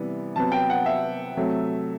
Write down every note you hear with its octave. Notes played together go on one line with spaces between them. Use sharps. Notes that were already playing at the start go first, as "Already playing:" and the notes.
Already playing: C3 E3 G3 B3
C3 F#3 B3 A5
G5
F#5
E5
C3 F#3 A3